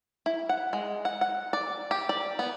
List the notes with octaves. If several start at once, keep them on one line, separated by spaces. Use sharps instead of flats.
E4
F#5
G#3
F#5
F#5
D5
G4
D5
B3